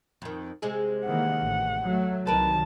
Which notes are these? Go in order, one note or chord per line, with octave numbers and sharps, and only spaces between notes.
F2 D#3
C3 G#3 G#4
D#3 E3 A#3 F#5
A1 A3
F#3 A3
C2 D#3 F#3 A#4 B4 A5